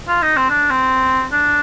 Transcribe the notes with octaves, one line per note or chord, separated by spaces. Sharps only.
F4
D#4
C4
D4
C4
D4